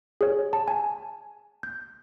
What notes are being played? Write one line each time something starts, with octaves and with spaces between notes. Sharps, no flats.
G#4 C#5
A5
G#5
G6